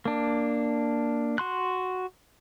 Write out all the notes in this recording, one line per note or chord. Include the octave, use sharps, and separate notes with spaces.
A#3 D4
F#4 C6 F#6